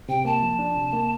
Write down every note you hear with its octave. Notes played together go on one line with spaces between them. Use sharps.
C3 G5
A#3 A5
F3
D4
C3
A#3